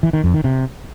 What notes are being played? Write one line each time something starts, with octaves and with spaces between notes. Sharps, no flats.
E3
D#3
F2
D#3
C3